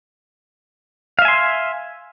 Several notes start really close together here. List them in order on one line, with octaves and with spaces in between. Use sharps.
F5 E5 G#5 C6